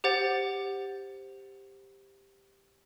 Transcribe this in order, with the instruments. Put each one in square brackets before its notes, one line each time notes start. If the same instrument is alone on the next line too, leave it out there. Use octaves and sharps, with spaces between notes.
[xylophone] G4 C5 F#5 A6